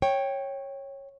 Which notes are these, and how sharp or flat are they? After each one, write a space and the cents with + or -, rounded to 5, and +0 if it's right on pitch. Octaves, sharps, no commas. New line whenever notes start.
C#5 -15 G5 +0